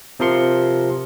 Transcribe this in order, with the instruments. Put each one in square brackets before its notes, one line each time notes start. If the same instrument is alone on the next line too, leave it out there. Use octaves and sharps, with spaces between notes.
[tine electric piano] C3 F3 A#4 C6 C#7